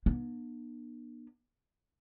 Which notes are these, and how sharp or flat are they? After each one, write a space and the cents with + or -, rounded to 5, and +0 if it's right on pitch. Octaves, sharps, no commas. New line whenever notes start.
B3 -40 D4 +45